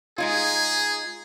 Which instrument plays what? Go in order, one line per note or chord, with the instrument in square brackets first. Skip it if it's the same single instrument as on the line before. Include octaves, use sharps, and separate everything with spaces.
[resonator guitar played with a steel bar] G#3 D#4 F4 [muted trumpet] G#4 [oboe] G#5